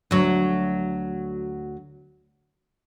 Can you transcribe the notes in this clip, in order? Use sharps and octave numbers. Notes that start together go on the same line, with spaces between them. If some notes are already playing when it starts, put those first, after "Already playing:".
D2 F#3